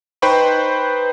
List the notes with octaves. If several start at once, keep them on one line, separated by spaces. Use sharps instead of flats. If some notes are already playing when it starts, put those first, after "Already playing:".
D#4 B4 C5 G5 B5 C#6